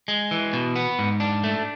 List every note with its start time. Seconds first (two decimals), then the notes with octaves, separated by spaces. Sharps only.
0.08 G#3
0.31 E3
0.53 B2
0.76 B3
0.99 G#2
1.20 D4
1.44 A3